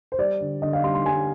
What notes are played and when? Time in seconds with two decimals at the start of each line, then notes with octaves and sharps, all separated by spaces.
0.12 C5
0.19 G3 D5
0.41 D3
0.62 D3 D#5
0.73 F5
0.84 G3 C6
0.95 C6
1.05 G3 G#5